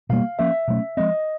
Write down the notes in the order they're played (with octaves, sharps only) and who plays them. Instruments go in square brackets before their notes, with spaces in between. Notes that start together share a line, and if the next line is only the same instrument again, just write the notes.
[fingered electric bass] B2 G3 A#3 [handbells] F5
[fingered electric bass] F3 A#3 C#4 [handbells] E5
[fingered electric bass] B2 F#3 A3 C#4
[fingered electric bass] F3 G#3 C4 [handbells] D#5